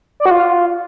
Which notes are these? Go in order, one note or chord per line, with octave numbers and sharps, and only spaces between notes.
D5
F#4
F4